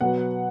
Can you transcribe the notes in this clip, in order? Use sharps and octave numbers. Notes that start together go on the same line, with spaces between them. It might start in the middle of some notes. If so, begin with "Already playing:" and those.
B2 F#3 B3 F#5